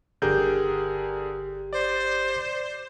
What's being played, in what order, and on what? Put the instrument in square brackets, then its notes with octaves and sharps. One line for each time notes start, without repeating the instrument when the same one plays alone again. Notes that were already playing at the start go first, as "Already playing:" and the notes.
[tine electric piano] G1 G4 G6 [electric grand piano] D3 G#4 A#4
[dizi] C5 [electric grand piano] D5